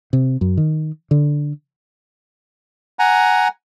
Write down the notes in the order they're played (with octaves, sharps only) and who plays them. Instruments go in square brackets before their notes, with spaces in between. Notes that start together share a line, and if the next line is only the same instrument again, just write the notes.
[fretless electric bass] C3
F#2
D#3
D3
[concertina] F#5 G#5 A#5